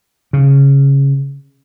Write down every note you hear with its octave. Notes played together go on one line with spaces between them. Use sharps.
C#3